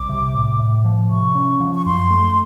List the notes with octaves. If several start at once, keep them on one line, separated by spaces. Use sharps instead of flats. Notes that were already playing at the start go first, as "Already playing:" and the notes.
Already playing: C2 D6
C3
A2
A2
F3
C3 C#6
C#4
F3
C#6
F#2 C6
A3